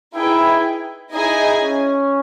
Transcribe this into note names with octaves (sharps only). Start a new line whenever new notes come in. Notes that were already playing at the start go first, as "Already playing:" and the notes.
D#4 E4 G#4 B4 G5
D#4 E4 G#4 D#5 G#5
C#4